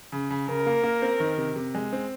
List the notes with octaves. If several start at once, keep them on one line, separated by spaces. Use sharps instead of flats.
C#3
C#3
C#3 A#4
A#3
A#3
C4
D#3
C3
C3
G#3
C4